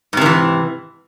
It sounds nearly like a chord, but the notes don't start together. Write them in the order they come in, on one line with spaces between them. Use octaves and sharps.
G#2 C3 D#3 E3